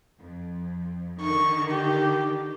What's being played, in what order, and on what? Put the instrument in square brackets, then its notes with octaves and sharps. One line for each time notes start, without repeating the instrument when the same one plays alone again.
[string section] F2
[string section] D3 D#3 [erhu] C#6
[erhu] G4